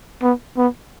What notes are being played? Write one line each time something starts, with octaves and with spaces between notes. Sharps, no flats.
B3
B3